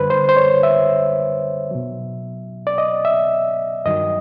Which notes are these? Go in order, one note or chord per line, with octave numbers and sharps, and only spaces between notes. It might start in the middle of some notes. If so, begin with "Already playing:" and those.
Already playing: F#2 D3 G3 B4 C5
C5
C5
C#5
E5
B2 F#3
D5
D#5
E5
G2 D#3 F#3 D#5